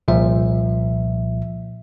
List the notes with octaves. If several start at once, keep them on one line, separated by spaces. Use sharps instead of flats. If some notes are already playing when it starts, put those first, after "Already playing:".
C2 A#2 F3 E5